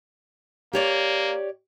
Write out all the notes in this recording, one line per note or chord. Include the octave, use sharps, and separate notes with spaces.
A#3 G4 C#5 D5